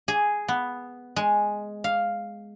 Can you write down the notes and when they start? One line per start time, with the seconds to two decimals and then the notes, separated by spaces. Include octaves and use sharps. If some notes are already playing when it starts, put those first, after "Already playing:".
0.08 G#4
0.48 B3
1.16 G#3
1.84 F5